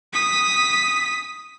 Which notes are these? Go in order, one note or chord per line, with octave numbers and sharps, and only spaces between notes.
D#6 B6